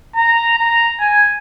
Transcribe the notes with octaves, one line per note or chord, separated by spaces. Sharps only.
A#5
A#5
G#5